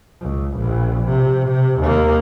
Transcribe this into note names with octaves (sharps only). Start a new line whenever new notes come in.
C#2
A#1
C3
C3
D#2 A#3